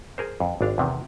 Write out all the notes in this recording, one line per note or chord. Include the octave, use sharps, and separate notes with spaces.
G#4 A#4 C5
F2
G#1 D4 F5
E2 C3 D#3